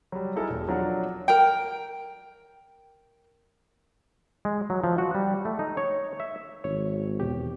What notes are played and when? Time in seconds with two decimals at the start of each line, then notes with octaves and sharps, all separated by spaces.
0.12 F#3 G3
0.36 D#4 E4 A4 A#4 G#5 A5
0.50 E1
0.68 F3 F#3 D4 A#4 F#5
1.28 A#4 G5
4.45 G#3
4.70 F#3
4.84 F3
4.98 F#4
5.15 G3
5.45 A3
5.59 D#4
5.77 C#5
6.20 E5
6.64 G#1 C#5
7.20 E2 B2 G4